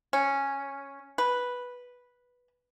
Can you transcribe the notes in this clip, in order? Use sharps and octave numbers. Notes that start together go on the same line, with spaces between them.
C#4
B4